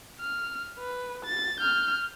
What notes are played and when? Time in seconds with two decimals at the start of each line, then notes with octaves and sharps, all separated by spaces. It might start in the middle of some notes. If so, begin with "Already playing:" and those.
0.21 F6
0.79 B4
1.25 A6
1.60 F6 G6